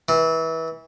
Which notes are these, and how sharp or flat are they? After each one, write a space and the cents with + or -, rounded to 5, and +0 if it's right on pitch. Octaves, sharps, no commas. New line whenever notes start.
E3 -25